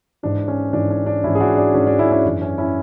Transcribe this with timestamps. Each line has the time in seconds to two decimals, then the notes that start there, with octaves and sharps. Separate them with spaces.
0.23 G#2 E3 D4
0.48 C#4
0.73 G#2 E3 D4
0.90 C#4
1.06 D4
1.24 G#2 E3 C#4 E4
1.35 G#4
1.40 D4 F#4
1.57 D4
1.74 G#2 E3 C#4
1.87 D4
1.99 C#4 E4
2.12 C#4 E4
2.24 F#2 E3 D4
2.41 C#4
2.58 C#4 E4